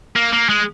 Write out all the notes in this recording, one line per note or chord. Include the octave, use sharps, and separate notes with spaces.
A#3
A#3
G#3